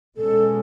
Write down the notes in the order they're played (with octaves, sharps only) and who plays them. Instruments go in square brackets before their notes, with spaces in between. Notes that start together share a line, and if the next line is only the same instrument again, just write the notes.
[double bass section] B2 G#3 C#4 [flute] A4